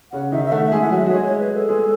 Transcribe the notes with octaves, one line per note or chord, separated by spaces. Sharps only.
C#3 C#4 F#5
D#3 D#4 E5
E5
A3 A4 F#5
E5
G#3 G#4
E4 F#5
F#3 F#4
E5
F#4
G#3 G#4 C#5
C#5
B4
A4
G#3 G#4